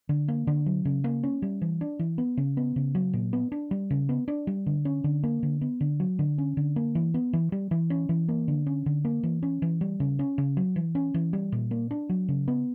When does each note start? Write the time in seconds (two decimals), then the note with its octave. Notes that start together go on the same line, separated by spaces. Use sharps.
0.09 D3
0.28 A#3
0.47 D3
0.66 F#3
0.85 C#3
1.04 A#3
1.23 C#4
1.42 G3
1.62 E3
1.81 D4
1.99 E3
2.18 B3
2.37 C#3
2.57 B3
2.76 C#3
2.95 F#3
3.13 A#2
3.33 B3
3.52 D4
3.71 G3
3.91 C#3
4.09 B3
4.28 D4
4.47 G3
4.66 D3
4.85 C#4
5.04 D3
5.23 A#3
5.43 D3
5.61 B3
5.81 D3
6.00 F#3
6.19 D3
6.38 C#4
6.57 D3
6.76 A#3
6.95 E3
7.14 B3
7.33 E3
7.52 G3
7.71 E3
7.90 C#4
8.09 E3
8.28 A#3
8.48 D3
8.67 C#4
8.86 D3
9.05 A#3
9.23 E3
9.43 C#4
9.62 E3
9.81 G3
10.00 C#3
10.19 C#4
10.38 C#3
10.57 F#3
10.76 E3
10.95 C#4
11.14 E3
11.33 G3
11.52 A#2
11.71 A#3
11.91 D4
12.10 F#3
12.29 C#3
12.48 B3